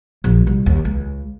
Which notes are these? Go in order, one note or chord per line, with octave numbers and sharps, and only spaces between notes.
A#1
C2
D#2
C#2